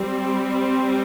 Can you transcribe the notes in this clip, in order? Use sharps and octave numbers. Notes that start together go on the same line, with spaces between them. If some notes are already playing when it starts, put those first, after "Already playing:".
Already playing: G3 C4